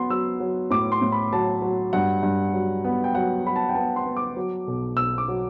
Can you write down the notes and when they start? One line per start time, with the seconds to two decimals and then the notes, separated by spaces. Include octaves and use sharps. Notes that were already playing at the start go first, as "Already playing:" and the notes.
Already playing: F#3 B3 C6
0.10 F#3 E6
0.40 F#3
0.71 A2 D6
0.92 C6
1.02 A2
1.12 B5
1.33 F#3 A5
1.62 F#3
1.93 G2 F#5
2.23 G2
2.54 F#3
2.85 B3
3.04 G5
3.15 F#3 F#5
3.45 F#3 B5
3.56 A5
3.69 G5
3.75 B3 A5
3.96 C6
4.06 B3
4.17 D6
4.36 F#3
4.67 B1
4.97 B1 E6
5.18 D6
5.28 F#3